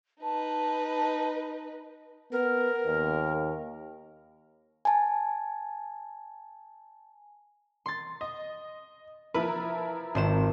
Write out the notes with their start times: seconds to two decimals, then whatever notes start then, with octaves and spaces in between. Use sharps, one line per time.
0.22 D#4 B4 A5
2.32 B3 A#4
2.86 D#2
4.85 G#5 A5
7.86 C6 A6
8.21 D#5
9.34 F3 E4 A#4 B4
10.15 G#1 C5 E7